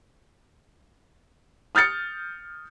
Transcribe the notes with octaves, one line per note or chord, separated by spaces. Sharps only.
D#6 F6 G6 A6 C#7